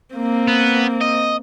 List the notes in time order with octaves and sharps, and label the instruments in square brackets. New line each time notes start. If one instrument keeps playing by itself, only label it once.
[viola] A#3 C4
[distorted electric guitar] B3
D#5